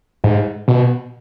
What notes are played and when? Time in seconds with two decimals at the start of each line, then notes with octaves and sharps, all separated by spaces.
0.24 G#2
0.68 B2